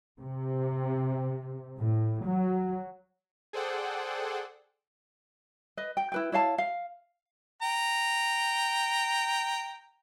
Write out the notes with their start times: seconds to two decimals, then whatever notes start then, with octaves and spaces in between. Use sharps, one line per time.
0.20 C3
1.78 A2
2.25 F#3
3.53 G#4 A4 C5 D5 F#5 G5
5.77 B4 D#5
5.97 G5
6.12 E4 B4 G5
6.32 E4 C#5 F5 A5
6.58 F5
7.62 G5 A#5